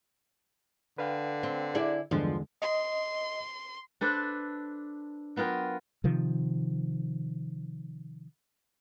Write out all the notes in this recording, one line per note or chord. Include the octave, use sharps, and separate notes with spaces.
D3 B4 F5 G5
C4
E4 G#4 D5
E2 G2 D3 F3 G#3
D#5 C6
D4 A4 B4 C5 D5
F#3 B3 F4 A#4 G5
C3 D#3 F3